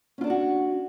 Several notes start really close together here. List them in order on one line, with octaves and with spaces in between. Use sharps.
C#4 F4 D4 A4 F#4